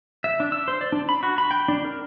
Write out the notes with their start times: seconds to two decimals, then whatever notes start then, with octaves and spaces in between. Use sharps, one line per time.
0.24 E5
0.40 D4
0.52 E6
0.68 C5
0.81 D5
0.92 D4
1.09 B5
1.23 F#4
1.38 B5
1.51 G5
1.68 D4
1.85 A#4